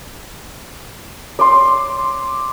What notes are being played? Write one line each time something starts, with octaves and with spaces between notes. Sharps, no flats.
D5 C6